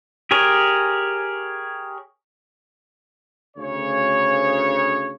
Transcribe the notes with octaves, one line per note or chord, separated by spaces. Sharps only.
G4 G#4 A#4 C#5
D2 C#3 C#5